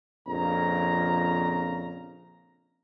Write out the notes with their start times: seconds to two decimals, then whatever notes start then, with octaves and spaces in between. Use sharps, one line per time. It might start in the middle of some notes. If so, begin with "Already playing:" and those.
0.27 A#1 F2 C#3 A#5